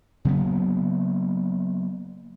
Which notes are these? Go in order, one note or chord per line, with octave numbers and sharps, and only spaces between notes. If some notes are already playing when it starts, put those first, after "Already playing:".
C#3 F#3 A#3 B3